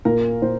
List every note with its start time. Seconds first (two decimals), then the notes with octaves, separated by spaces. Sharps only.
0.05 A#2 A#4
0.42 A#2 C5